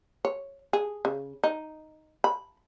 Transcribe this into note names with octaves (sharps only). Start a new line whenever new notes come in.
C#5
G#4
C#3
D#4
B5